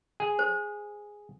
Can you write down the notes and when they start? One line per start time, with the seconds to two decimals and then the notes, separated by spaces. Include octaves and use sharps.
0.20 G#4
0.39 C5